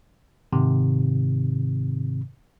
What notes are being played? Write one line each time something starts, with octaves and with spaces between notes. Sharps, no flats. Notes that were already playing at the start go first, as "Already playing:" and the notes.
G#2 C3 D#3